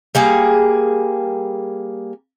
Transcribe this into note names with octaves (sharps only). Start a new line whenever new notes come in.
G3 A#3 G#4